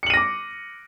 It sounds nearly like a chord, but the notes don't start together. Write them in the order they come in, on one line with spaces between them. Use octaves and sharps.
C#7 F#7 D#7 A#6 D6